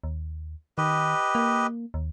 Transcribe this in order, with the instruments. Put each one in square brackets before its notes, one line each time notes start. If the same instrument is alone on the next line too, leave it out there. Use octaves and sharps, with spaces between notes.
[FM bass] D#2
[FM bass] D#3 [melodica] G4 B4 D#5
[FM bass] A#3
D#2